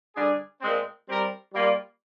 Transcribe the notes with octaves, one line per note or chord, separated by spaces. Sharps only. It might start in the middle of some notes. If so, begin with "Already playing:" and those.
D3 G3 D4 G#4
A#2 G#3 C4
G3 C4 G4 A#4
G3 A#3 F4